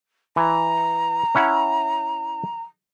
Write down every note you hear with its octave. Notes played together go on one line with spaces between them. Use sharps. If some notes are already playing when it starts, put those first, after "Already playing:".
E3 A#5
C#4 E4 F#5